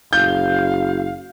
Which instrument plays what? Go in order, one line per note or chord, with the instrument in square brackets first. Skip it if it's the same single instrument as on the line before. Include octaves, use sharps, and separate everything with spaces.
[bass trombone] F#1 [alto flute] F5 [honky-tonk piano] G6